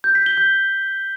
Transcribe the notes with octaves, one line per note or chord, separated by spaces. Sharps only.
G6
B6
G7
G6